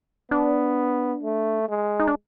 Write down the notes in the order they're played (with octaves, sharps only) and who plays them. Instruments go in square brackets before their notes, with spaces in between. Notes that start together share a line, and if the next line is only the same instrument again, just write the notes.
[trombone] B3 [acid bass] D4
[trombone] A3
G#3
[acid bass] D#4
D4